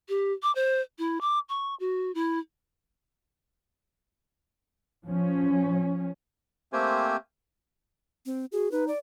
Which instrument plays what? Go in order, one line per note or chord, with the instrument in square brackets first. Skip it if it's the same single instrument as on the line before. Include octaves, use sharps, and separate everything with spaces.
[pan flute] G4
D6
C5
E4
D6
C#6
F#4
E4
[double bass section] F3 C#4
[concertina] A3 A#3 C4 G4 C5 G#5
[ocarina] C4
[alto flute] F#4 [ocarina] G#4
[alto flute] D#4 [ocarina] B4
[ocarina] D5